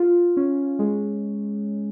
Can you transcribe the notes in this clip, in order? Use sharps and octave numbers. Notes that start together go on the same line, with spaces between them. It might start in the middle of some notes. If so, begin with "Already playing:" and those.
Already playing: F4
C#4
G#3